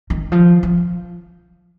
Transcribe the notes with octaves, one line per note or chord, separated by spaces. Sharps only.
D#3
F3
F3